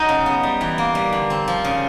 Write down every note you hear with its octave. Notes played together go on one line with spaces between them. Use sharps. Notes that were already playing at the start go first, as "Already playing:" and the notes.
Already playing: F#3 D#4 D#5
C#3
B3
G3
E3
A#3
G3
D3
C4
F3
C#3